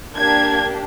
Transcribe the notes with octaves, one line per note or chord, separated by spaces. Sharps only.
A#3 D4 G4 G#6